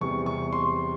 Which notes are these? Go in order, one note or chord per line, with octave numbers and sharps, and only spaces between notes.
E2 C3 G3 C#6
C#6
C6